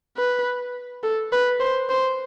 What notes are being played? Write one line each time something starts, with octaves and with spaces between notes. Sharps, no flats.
B4
A4
B4
C5
C5